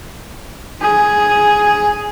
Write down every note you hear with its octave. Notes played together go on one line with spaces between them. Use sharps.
G#4